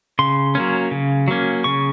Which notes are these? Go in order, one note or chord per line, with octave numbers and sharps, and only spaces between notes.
C#3 C6
F#3 A#3 C#4
C#3
F#3 A#3 C#4
C#3 C#6